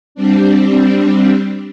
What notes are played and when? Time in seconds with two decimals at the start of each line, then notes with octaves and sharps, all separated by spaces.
0.15 G3 C4 D4